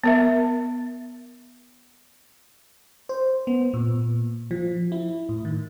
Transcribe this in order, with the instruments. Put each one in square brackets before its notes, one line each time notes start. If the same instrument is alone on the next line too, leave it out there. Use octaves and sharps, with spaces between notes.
[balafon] B3 A#4 E5
[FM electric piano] C5
B3
A#2
F3
E4
A2
D#3